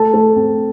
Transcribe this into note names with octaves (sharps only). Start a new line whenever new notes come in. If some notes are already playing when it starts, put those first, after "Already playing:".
Already playing: A3 A4 A5
A3
C4